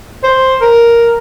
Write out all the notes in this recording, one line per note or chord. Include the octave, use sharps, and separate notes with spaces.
C5
A#4